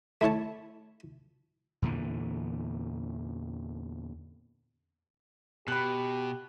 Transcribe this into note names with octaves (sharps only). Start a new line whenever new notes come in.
A3 E4 C#5 A5
E2 A#2 D3 E3
B2 G4 B5 F#6